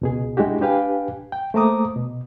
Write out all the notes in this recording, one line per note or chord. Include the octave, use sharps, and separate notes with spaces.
C#2 B2 G#4
G#3 D4 E4 F#4 G4
D4 G4 B4 F5 G5 G#5
G5
A3 A#3 C5 A#5 D6 D#6
B2